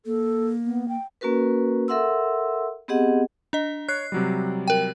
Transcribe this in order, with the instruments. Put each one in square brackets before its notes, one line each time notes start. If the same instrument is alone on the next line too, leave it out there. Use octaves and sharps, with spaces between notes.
[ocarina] A#3 [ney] A4
[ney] B3
G5
[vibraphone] A#3 C#4 F#4 A#4 B4
A4 A#4 E5 F#5 C6 E6
B3 C4 G4 G#4 D#5 F#5
[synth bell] D4 D#5
[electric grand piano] C#5 [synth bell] F#6 C7
[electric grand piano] C3 F#3 G3
[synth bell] A#4 G5